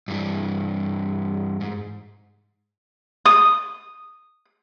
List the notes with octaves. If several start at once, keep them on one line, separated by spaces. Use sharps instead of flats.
G2 E3
G#2
D#6